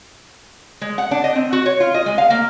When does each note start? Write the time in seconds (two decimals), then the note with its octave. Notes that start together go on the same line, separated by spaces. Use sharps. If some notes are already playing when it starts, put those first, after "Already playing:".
0.82 G#3
0.98 F#5
1.11 D4
1.24 D#5
1.35 C4
1.53 F#4
1.66 C#5
1.80 F4
1.94 D#5
2.06 G#3
2.18 F5
2.30 A#3